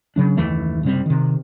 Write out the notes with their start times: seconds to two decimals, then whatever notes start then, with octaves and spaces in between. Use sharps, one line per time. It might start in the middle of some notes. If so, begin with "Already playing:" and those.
0.16 C#3 F#3 D4
0.37 F#1 D#2 E3 A3
0.83 F#1 C3 G3 C4
1.06 C3 D#3